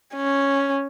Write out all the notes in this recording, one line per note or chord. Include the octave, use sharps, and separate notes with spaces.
C#4